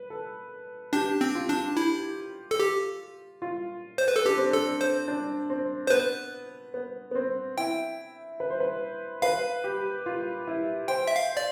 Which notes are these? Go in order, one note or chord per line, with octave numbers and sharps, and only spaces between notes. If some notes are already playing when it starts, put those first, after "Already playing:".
Already playing: B4
A4
D4 G4
C4
F4
D4
E4
A4
G4
F4
C5
B4
A4
D4 G4
C4
D4 A4
C5
D4
C4
C5
B3 B4
B3
B3
C4
E4 G5
B4
C5
B4
B4 F5
G4
F4
E4
C5 G5
E5
F5
D5